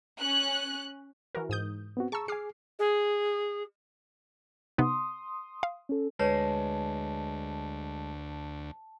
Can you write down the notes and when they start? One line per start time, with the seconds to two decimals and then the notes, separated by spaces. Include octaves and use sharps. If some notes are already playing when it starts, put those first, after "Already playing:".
0.19 C#4 F#6
1.35 E3 F#4 A#4
1.49 G#2 D#6 G6
1.97 B3 C4 F#4
2.12 G#4 A5 A#5 C#6 E6
2.28 G#4 G#5 D6 F6 C7
2.79 G#4
4.78 C3 B3 D#4 C6 D#6
5.63 F5
5.89 C#4 A4
6.20 D2 G#3 B4 C#5 A5